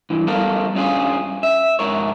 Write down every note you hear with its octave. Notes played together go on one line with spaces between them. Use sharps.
G2 E3
G3 B3 A4 A#4 F5
G2 C#4 F4 G#4
E5
G#2 A#4 C#5